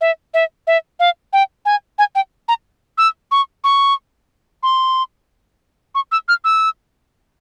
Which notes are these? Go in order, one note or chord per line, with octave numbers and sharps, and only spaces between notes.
E5
E5
E5
F5
G5
G#5
G#5
G5
A#5
E6
C#6
C#6
C6
C#6
E6
F6
E6